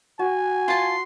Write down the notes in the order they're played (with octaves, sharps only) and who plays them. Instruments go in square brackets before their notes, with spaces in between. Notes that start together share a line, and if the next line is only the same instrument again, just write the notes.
[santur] F#4 [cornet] G#5
[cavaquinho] F4 A5 [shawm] C6